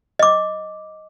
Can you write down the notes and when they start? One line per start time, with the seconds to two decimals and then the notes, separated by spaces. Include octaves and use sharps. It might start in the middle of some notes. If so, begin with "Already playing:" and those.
0.19 D#5 D6